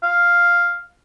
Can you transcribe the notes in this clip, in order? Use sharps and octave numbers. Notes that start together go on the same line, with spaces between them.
F5